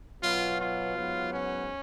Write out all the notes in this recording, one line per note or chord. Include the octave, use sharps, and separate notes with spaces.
B2 F#3 B3 F4
F4
G#2 F#3 B3
C#4